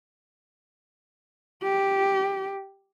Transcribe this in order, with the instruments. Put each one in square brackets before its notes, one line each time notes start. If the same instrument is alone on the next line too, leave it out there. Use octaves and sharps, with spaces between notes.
[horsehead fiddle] G4